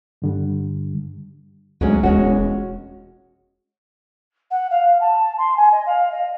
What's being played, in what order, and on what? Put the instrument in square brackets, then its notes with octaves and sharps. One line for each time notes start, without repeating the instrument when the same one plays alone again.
[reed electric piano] G2 D3 G3
[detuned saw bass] D2 [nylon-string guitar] F#3 G#3 C#4
[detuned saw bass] E1 [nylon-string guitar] G#3 C#4 F#4
[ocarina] F#5
F5
A5
C6
G#5
D#5
F5
D#5